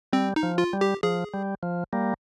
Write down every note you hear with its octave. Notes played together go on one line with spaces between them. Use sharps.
G3 C4
D#4
F3
F4
G3
G4
F3 G#4
G3
F3
G3 A#3